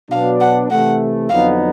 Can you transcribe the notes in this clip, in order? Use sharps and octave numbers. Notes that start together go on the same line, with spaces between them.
B2 F#3 B3 D4 F5
F#5
C3 E3 A3 F#5
F2 D3 F#3 B3 D#4 F5